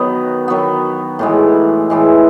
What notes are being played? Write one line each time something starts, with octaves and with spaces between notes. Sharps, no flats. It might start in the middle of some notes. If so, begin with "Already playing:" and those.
Already playing: D#3 F#3 B3
D#3 F#3 B3
A2 E3 G#3
A2 E3 G#3